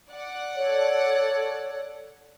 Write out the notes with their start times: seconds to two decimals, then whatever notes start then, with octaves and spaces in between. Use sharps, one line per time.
0.10 D5 F#5
0.56 A4 C#5